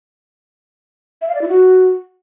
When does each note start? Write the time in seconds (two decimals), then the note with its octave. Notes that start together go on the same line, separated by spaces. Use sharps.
1.21 E5
1.28 F5
1.35 D5
1.42 E4
1.48 F#4